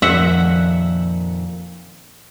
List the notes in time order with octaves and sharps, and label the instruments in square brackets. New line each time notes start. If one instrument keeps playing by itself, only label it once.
[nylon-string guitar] F2 A#2 D#3 [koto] E5 F#5